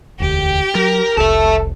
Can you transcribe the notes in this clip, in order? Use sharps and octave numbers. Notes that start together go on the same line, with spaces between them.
E1 D2 D3 G4 G5
F#3 A#4
F1 C2 A4 E5 A5